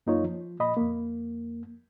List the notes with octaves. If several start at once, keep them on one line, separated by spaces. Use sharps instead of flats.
F#2 A#3 D#4 F4 C#5
F3
A#2 D#5 B5
F2 A#3